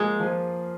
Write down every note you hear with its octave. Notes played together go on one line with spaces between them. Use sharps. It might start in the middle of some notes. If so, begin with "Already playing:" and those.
Already playing: F3 G#3 A#3 F4 G#4
F3